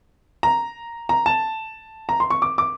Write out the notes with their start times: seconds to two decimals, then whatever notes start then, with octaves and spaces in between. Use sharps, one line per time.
0.43 A#5
1.09 A#5
1.26 A5
2.09 A#5
2.20 C6
2.30 C#6
2.42 D6
2.58 D6